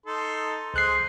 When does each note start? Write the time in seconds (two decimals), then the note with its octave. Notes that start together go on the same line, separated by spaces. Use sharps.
0.06 D#4 A4 C6
0.74 C#2 G#4 C5 D#5 F#6 C7